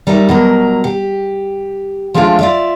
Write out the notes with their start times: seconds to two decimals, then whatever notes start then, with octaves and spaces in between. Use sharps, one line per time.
0.07 G3 D#4 A#4 E5
0.29 B2 F#3 A#4
0.84 G4
2.14 F3 G#3 A3 D4 F4
2.39 F4 D5 E5